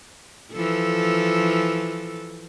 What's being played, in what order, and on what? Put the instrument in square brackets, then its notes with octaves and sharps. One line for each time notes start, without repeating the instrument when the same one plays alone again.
[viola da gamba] E3 F3 A4